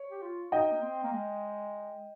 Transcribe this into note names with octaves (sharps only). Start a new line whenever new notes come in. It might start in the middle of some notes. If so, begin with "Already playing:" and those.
Already playing: C#5
G4
F4
D#4 D#5 G5
A#3
C4
A#3
G#3